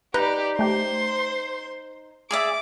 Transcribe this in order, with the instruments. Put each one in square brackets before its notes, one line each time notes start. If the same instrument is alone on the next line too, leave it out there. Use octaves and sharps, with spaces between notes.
[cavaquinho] D#4 [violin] G4 D5 [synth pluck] B4
[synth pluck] A3 G4 [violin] C5 C6
[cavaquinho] G#4 D5 E5 [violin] D6